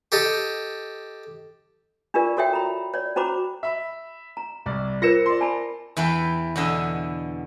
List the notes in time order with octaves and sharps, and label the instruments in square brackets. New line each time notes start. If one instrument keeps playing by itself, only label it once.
[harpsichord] G4 A4 D#5
[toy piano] D4 F4 G4 A#4 D5
F#4 A4 C#5 E5 G5
A#5 B5
C#5 D5
C#4 F#4 C5 A#5 B5 D6
[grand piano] E5 B5
[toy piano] A#5
[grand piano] C2 D5
[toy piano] F4 A#4 C5 [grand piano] A#6 C#7 E7
[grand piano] D5 C6
[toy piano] G#5 A5 B5
[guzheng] E2 E3 B4 G5
E2 B2 D3 D#5 E5